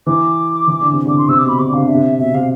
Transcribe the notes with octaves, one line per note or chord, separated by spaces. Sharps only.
E3 D6
E3
D3
C3
D3 D6
C6
C3 E6
D6
B2
B5
C3 D6
D3
C3 F5
D3 E5
C3
B2 E5
C3 F5